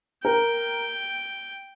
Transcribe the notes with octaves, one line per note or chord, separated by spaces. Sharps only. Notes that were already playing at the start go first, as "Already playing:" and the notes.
A#4 G5